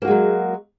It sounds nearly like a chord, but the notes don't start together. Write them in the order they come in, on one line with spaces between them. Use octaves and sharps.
A#3 F#4 G#3 F#3